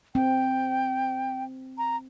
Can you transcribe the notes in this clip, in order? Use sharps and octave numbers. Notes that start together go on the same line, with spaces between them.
C4 G5
A#5